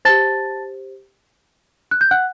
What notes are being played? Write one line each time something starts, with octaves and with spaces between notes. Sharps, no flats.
G4 C5 A5 A6
F#6
G6
F#5 F#6